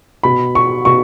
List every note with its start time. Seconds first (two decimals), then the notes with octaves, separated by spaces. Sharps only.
0.23 B2 B5
0.55 C#6
0.85 B2 C#6